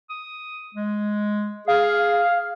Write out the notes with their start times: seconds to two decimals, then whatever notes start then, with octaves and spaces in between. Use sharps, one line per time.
0.10 D#6
0.75 G#3
1.68 G#4 F5